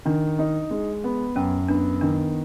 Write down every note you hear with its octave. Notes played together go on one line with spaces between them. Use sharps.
D#3 D4
D#4
G#3
B3
F#2 C#4
B3 D4
D#3 D4